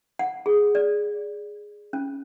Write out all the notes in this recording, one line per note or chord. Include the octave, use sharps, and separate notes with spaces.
F#5
G#4
D5
C#4